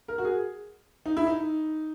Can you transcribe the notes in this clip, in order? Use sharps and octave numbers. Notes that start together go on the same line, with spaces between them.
A#4
F#4
G#4
D#4
E4
D#4